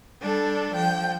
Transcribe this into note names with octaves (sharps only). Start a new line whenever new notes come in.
G3 D4 A4
F3 G5